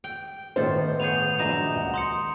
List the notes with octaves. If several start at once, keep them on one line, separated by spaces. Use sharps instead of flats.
G5
G1 A2 D#3 A4 C5 D#5
B3 G#4 C#5 G6 F7
A#1 F#3 D#4 D#5 A#5 E7
D#1 C#2 F#5
C6 D#6 A#6 C#7